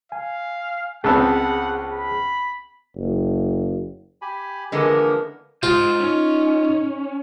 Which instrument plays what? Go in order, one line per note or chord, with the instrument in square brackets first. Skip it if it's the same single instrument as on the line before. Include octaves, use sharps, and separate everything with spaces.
[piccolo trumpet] F5 [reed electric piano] G#5
[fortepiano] C#2 B3 C4 [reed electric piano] G#4 A5 E6 [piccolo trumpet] F#5
[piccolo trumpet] B5
[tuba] F#1
[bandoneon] G4 G#5 B5
[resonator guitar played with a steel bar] D3 G#3 B3 [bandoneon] E3 F3 A#3 [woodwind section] A#4
[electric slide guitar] G#3 C5 D#5 [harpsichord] F4
[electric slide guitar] C#4 [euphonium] D#4